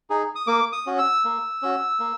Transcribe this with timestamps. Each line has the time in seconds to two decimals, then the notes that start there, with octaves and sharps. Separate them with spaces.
0.10 D#4 G#4
0.36 D#6
0.47 A#3 D6
0.72 D#6
0.86 C#4 F#4
0.98 E6
1.24 A#3
1.62 C#4 F#4
1.99 A#3